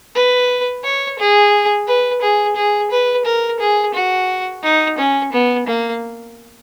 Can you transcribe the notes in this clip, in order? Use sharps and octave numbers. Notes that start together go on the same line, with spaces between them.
B4
C#5
G#4
B4
G#4
G#4
B4
A#4
G#4
F#4
D#4
C#4
B3
A#3